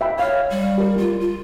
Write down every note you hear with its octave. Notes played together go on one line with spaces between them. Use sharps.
E5 G5 B5
C#5 F5
G3
G4 A#4
F4
F4